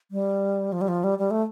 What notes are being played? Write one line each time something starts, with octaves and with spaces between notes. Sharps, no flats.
G3
F3
G3
F3
G3
G3
A3